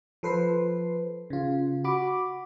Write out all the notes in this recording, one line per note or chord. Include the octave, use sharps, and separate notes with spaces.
F3 A4 B4 C5 C7
C#3 F4
F#4 B5 D6